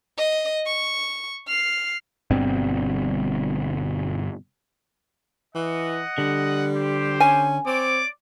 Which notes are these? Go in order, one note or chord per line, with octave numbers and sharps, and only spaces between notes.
D#5
C#6
F6 C7
G1 G2 B2 C4
E3 D#5 F#5
D3 G3
G4 C5
C#4 G#5
C4 C#5 D5 D6